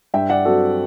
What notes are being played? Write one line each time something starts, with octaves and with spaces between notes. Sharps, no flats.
G2 E5 G5
D5 F#5
F#3 C4 F#4 A4